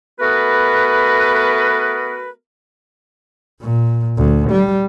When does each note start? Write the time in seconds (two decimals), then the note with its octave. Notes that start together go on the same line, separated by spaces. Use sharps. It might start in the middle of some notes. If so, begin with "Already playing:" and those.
0.20 A3 B3 F#4 A#4 B4
3.62 A#2
4.17 D2
4.51 G3